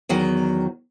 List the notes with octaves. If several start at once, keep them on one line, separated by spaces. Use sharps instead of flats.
E2 D#3 F#3